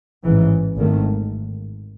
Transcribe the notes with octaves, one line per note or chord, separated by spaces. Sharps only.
A1 G#2 E3
G#1 G#2 D#3 A3